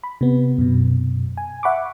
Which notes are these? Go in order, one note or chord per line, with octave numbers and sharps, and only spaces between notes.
B5
C3 B3
F#2 B2
G#5
E5 F#5 B5 C#6 D6